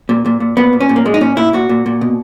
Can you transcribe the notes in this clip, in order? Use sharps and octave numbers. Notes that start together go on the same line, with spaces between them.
A#2
A#2
A#2
A#2 B3
A#2
C#4
A#2
A#3
A#2 G#3
D#4
A#2 C#4
A#2 E4
A#2 F#4
A#2
A#2
B2